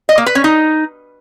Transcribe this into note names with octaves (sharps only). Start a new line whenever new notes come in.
D#5
A#3
B4
C#4
D#4